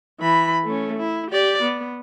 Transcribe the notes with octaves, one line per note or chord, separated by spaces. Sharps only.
E3 B5
A3 C#4
E4
G4 D5
B3